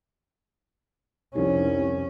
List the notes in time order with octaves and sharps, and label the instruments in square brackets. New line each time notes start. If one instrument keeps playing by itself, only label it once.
[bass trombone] C2 [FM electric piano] F2 C3 [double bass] C#4 [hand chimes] D#4